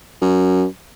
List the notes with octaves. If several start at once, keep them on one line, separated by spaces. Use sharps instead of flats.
F#2